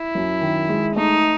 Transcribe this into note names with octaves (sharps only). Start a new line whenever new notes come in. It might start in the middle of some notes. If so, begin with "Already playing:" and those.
Already playing: E4
F#2
D#3
G#3
A3 D#4